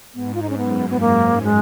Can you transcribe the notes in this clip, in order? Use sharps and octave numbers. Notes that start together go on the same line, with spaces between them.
G#2 B3
F4
D#4
C#4
F#2 B3
B3
F#2 A#3
G#3